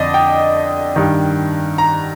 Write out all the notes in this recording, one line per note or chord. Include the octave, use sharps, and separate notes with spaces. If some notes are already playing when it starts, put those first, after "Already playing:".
Already playing: F2 D3 D5 D#5
G5
G2 D#3
A#5